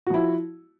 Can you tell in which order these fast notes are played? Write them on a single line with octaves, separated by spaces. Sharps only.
F#4 F3 E4